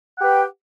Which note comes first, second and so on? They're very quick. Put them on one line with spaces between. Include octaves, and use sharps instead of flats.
F#5 G4 B4 G5